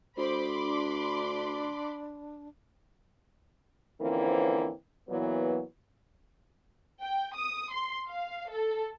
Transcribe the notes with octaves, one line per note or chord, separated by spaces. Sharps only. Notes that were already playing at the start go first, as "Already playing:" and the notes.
D2 C5 B5 C6 D6
D4
D3 E3 F3 A#3 C4 C#4
A#2 E3 F#3 B3
G5
D#6
C6
F5
A4